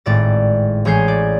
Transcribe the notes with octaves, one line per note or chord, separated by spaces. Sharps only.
G#1 A2 D5 A6
A1 G#4 C#5 G6 G#6 C7
D5